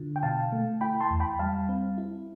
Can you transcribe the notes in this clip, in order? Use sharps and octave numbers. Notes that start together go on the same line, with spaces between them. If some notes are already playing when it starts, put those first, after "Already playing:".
Already playing: D3 F4
G5
B2 F5 A5
A3
E4 G5 B5
A5 C6
E2
G5 B5
G3 F5 A5
C4
E4